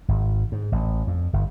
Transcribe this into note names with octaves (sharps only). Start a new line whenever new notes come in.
G#1
G#2
A1
F2
G1